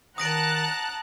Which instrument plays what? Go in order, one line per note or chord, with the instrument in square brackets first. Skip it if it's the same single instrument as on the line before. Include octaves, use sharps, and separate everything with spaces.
[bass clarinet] D#3 [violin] F#5 A#5 [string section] A5 F#6 [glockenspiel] D#6 A#6 D7